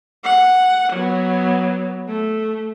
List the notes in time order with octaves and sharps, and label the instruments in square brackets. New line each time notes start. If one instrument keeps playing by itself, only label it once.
[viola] F#5
F#3 B3
A3